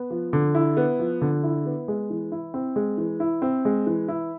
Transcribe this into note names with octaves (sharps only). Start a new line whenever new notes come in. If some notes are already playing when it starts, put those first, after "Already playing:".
Already playing: B3
F3
D3
E4
B3
F3
D3
E4
B3
G#3
E3
E4
C4
G#3
E3
E4
C4
G#3
E3
E4